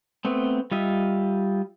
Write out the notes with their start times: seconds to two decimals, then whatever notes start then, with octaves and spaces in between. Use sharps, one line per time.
0.25 A3 B3 C4
0.71 G3 F4 D#5 E5